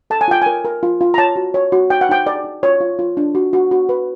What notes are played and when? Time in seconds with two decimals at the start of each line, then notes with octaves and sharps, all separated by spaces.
0.10 A4 A5
0.21 G#5
0.28 F4 G5
0.42 A#4 G#5
0.65 A#4
0.83 F4
1.01 F4
1.14 A#5
1.18 C#5 A5
1.36 F#4
1.54 C#5
1.72 F#4
1.90 D#4 G5
2.01 F#5
2.09 D#4 G5
2.27 G#4 D5
2.44 D#4
2.63 F4 C#5
2.80 F4
2.99 F4
3.17 D4
3.35 F#4
3.53 F#4
3.71 F#4
3.89 B4